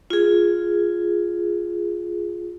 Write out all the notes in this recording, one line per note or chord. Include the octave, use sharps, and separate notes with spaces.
F4 G#4